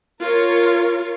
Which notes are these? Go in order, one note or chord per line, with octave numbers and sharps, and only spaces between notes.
F4 A#4 C#5